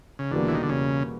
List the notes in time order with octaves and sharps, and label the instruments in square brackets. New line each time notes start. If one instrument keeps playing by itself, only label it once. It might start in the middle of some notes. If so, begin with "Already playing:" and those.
[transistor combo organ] C#3
[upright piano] E2 B2 G3 A#3 [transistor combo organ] D3
[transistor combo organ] E3
D#3
D3
C#3